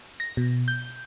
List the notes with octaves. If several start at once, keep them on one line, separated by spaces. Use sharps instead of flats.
A#6
B2
G6